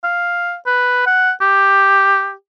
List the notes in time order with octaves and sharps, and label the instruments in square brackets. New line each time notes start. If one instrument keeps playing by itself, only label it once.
[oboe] F5
B4
F#5
G4